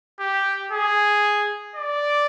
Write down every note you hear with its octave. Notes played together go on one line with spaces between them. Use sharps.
G4
G#4
D5